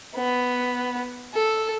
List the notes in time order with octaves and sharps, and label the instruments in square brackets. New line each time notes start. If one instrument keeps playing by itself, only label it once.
[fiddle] B3
A4